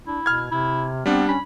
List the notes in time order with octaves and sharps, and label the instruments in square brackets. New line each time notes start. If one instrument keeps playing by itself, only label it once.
[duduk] D4 [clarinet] E4
[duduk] B2 [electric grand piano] F6 G#6
[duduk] C3 [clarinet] E4
[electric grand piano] G3 D4 [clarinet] B3 [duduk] C4
[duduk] C#4 [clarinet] B5